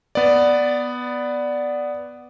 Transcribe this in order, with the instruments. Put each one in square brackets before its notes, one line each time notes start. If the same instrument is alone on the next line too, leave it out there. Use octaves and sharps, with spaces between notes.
[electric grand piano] B3 D5